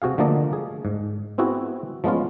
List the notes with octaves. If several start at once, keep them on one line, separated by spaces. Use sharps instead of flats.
C3 F#4 G#4 F5
D3 F3 A3 A#3 D5 D#5
G#4
G#2
B3 C4 E4 F#4 G#4
F3 G#3 B3 C#4 F4